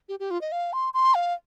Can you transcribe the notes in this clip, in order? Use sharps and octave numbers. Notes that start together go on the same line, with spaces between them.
G4
G4
F4
D#5
F5
C6
C6
F5